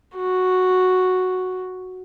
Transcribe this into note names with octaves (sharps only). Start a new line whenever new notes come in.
F#4